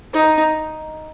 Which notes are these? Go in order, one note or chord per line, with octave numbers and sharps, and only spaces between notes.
D#4